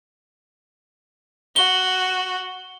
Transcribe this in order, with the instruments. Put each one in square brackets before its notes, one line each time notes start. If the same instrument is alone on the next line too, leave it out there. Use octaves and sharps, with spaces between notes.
[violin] F#4 [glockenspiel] G7